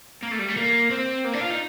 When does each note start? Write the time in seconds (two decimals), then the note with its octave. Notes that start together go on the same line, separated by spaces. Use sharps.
0.23 A#3
0.31 A3
0.39 G3
0.49 A3
0.56 A#3
0.91 C4
1.25 A#3
1.34 D4
1.41 F4
1.50 D#4